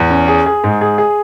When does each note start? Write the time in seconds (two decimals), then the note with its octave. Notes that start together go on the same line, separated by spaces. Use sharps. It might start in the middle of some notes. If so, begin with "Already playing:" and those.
Already playing: E2
0.10 C#4
0.28 G#4
0.46 G#4
0.64 G#2
0.81 G#4
0.98 G#4